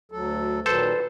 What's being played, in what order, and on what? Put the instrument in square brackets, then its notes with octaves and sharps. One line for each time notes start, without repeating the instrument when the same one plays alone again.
[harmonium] D2 F#3 A4
[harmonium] A#2 D#3 F#3 [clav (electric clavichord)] A4 C5 [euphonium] B4